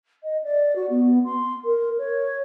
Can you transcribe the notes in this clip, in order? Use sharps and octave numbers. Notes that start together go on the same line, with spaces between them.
D#5
D5
F#4
B3
C6
A#4
C#5